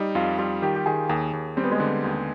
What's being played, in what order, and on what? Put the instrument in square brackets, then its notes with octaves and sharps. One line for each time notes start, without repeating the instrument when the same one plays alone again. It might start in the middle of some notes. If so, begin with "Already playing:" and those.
Already playing: [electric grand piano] G3 [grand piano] D#4
[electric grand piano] F2 [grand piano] F4
[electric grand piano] G3 [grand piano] F4
[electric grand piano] D#3 [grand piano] G4
[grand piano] G4
[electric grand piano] D#3 [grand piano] G#4
[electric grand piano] D#2 [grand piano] G#4
[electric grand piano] D#2
[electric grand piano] G3 [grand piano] C4
[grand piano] B3
G#3
[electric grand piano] D3 [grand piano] B3
[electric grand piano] D#2